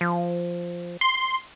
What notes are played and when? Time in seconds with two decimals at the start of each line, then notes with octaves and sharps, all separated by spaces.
0.01 F3
1.01 C6